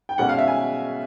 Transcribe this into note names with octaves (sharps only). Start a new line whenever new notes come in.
G5
B2 G#3 C#4 F#5
F5
E5
G#5